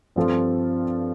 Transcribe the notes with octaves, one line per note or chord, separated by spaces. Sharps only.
G2 F3 C4 F4 A4